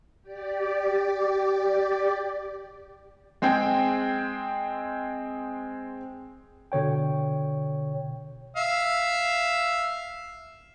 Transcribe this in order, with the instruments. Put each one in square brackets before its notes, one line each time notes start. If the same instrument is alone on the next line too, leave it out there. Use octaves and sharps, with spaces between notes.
[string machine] G4 D5
[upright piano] G#3 C4 G#4 G5
[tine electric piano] B2 D3 C#5 G5
[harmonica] E5 F5